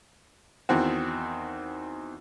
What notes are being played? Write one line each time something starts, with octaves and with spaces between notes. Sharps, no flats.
E2 D#3 C4 F#4